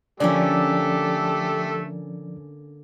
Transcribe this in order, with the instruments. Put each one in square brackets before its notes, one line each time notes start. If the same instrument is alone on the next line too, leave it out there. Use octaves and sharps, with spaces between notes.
[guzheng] D3 A#3 C#4 [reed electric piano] F3 D5 [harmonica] A3 A4 [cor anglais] G4